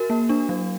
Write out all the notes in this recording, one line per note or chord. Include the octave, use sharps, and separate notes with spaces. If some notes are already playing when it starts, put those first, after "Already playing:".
Already playing: F#4 A#4
A#3
D4
F#3